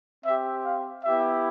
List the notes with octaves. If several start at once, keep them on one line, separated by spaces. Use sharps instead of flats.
C4 G4 E5
F5
B3 E4 G4 E5